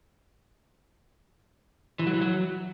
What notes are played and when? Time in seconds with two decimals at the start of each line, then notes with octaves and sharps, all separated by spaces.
1.99 E3
2.07 F#3
2.14 E3
2.21 F#3